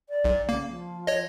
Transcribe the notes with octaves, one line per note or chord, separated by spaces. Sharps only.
D5
B1
C#3 A#3
F3
C#5 D#5